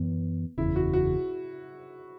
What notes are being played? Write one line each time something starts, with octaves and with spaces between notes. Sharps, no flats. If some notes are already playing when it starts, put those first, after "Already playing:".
Already playing: F#2 E3 B3
F#1 E2 C#3 E4
F#4
F#4